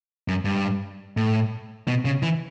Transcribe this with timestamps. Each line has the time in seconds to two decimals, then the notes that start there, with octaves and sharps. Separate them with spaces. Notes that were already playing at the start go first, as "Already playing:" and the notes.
0.28 F#2
0.45 G2
1.17 A2
1.88 B2
2.05 C#3
2.23 E3